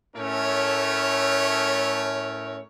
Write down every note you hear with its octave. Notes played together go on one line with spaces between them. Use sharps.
A2 A3 C#4 A4 A#4 C#5